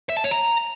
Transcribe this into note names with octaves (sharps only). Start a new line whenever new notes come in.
E5
A5
C#5
A#5